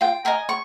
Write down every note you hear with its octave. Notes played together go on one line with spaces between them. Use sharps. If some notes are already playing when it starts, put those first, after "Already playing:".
F4 G5
A#4 D#5 G#5
C#6